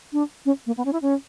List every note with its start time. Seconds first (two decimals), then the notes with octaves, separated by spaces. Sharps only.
0.13 D4
0.45 C#4
0.66 A#3
0.77 B3
0.85 C#4
0.93 E4
1.02 C#4